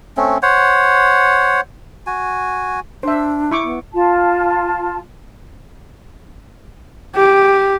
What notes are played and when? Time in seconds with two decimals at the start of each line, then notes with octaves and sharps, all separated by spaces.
0.17 A3 C4 C#4
0.43 C5 C#5 F#5
2.07 F#4 G#5
3.03 D4 C5 E5
3.51 E4 C#6 D6
3.64 B3
3.93 F4 A5
7.15 G4